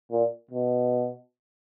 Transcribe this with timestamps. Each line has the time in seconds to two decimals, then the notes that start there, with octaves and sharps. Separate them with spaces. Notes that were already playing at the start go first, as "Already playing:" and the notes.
0.11 A#2
0.51 B2